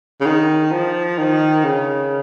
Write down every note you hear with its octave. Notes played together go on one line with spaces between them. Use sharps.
C#3
D#3
F3
D#3
C#3